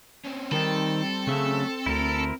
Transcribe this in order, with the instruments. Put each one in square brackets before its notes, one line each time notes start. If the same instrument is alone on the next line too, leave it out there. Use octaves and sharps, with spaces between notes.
[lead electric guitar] C4 C#4
[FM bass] D#3 [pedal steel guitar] G3 [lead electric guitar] C4 [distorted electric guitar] A4
[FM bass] C#3 [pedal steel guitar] F#3 A3 E5
[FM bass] D2 [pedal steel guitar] E4 A#4